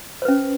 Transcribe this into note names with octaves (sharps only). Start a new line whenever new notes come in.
C#4 B4 C5